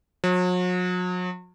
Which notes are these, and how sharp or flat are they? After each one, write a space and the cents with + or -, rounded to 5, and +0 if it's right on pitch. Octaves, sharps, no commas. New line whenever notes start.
F#3 -40